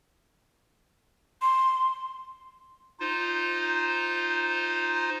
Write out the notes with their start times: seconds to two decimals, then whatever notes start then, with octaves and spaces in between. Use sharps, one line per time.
1.42 C6
3.00 D#4 F4 C5